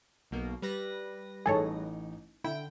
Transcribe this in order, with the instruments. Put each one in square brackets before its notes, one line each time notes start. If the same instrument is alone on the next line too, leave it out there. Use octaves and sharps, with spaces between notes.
[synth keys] B1 B2 A#3
G3 B4 A#6
[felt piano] A1 D#4 [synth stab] G#4 A4 C#5
[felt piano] D3 [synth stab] E4 [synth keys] G5